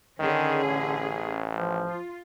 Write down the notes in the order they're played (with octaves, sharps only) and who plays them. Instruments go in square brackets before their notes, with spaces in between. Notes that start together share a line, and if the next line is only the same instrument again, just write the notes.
[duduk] D3 [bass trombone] D#3 [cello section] C#4 G#4
[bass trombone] A1
[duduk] F3
[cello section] F4